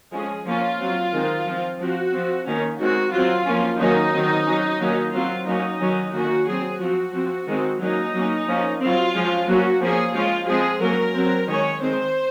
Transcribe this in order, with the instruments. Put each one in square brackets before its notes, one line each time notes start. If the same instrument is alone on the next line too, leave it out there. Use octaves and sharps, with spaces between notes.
[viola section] F3 G#3 C#4 G#4
F3 A#3 C#4 F4
F#3 C4
D#3 G#3 C4
F3 C4
F3 C4 F#4
F3 C4
D#3 A#3 C#4
D#3 G#3 C4 F#4
F#3 C4 F4
F3 A#3 C#4
D#3 F#3 A#3 C#4 D#4
D#3 F#3 C4
F#3 C#4
D#3 F#3 A#3 C#4
F#3 C4 F4
F#3 A#3 C#4 D#4
D#3 F#3 C#4
D#3 A#3 C#4 F#4
F#3 C4 G#4
F3 C4 F#4
F3 C4
D#3 G#3 C4
F#3 A#3 C#4 D#4
F#3 A#3 C#4
F3 A#3 C#4
F#3 C4 F4
F3 G#3 C#4
F#3 A#3 C#4 F#4
F3 A#3 C#4 G#4
F3 G#3 C#4 F4
F3 G#3 C4 G#4
F#3 A#3 C#4 A#4
F#3 C4
D#3 G#3 C#4 C#5
D#3 G#3 C4 C5